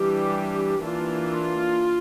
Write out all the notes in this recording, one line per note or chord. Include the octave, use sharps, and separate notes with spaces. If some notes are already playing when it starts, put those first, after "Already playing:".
Already playing: E3 G3 D4 G4
E3 A#3 D4 F4